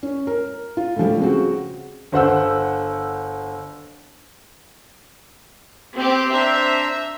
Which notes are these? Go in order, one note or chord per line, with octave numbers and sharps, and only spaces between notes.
C#4
A#4
F4
A2 D3 F3 G3
C#3 C4 F#4
G1 C5 F#5 E6
C4 G4
D4 C5 E5 A#5